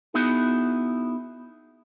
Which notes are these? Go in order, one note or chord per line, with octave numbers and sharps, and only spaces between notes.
B3 D#4 E4 F#4 G#4